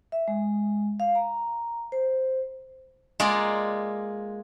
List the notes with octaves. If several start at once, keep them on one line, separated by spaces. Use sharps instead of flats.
E5
G#3
F5
A#5
C5
G#3 A#3 F4 D5